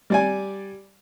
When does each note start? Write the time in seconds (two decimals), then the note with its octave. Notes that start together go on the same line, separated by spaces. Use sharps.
0.10 G3 D5 G#5